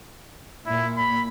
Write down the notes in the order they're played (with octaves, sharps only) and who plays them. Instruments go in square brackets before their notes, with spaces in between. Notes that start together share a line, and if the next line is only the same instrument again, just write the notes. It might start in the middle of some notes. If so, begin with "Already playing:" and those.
[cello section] A#2 [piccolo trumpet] E4
[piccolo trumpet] B5